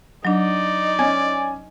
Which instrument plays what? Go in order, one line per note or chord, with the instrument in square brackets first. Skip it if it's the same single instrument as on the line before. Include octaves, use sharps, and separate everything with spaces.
[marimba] F#3 D4 [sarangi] D#4 [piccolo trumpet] D5
[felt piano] C#4 G#5 [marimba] G#6